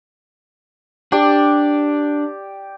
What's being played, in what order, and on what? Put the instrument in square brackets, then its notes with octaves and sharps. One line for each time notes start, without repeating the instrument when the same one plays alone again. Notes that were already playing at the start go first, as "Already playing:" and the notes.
[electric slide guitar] D4 [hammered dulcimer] G4 D5